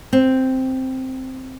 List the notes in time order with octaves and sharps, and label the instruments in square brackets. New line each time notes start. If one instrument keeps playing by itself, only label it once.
[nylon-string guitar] C4